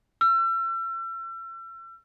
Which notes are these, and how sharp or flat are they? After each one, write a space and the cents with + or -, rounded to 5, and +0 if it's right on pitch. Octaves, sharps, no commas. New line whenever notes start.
E6 +40